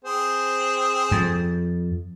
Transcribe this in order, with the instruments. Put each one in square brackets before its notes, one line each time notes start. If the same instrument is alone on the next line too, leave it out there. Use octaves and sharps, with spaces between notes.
[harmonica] C4 G#4 C5
[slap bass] F2